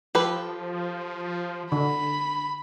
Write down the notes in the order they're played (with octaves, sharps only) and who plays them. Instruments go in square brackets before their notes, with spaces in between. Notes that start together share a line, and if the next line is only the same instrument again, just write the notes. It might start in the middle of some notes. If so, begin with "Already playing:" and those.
[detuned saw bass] F3 [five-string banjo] G4 A4 B4
[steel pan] D3 [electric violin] B5